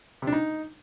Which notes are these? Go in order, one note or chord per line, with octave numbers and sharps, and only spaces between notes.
C3
D4
D#4